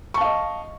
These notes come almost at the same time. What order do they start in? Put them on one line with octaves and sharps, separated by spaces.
C#6 A5 F5 D#5